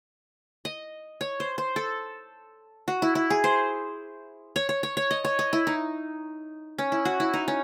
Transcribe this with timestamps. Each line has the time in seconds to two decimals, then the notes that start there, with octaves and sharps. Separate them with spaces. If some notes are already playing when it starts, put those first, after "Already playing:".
0.65 D#5
1.21 C#5
1.40 C5
1.58 C5
1.76 A4
2.88 F#4
3.02 E4
3.15 E4
3.30 G#4
3.44 C5
4.56 C#5
4.69 C#5
4.83 C#5
4.97 C#5
5.11 D#5
5.25 C#5
5.39 D#5
5.53 E4
5.67 D#4
6.78 C#4
6.92 E4
7.05 F#4
7.20 E4
7.34 D#4
7.48 C#4